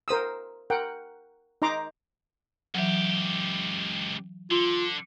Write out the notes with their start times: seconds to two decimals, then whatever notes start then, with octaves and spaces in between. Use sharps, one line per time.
0.08 A#4 C5 D#6 E6
0.70 A#4 F#5 G5
1.62 D#4 D#5 A#5 C6 D6
2.75 C#2 E3 F#3 G4
4.51 D3 F4